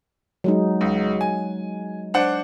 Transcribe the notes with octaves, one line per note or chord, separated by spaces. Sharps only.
F#3 G#3 D#4
C#2
G#5
D4 C5 F#5